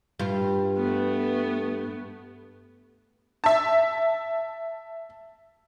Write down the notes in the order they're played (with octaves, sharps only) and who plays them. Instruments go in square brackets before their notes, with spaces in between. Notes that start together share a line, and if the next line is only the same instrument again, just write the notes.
[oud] G2 F4
[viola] A3 B3
[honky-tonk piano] E5 A5